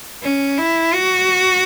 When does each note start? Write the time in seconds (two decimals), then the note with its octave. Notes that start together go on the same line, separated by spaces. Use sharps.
0.22 C#4
0.58 E4
0.93 F#4